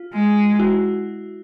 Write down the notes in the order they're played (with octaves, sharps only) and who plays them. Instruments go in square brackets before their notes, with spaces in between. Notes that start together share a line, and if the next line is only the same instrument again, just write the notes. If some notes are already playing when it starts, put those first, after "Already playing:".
Already playing: [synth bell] F4
[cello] G#3
[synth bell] E4 F#4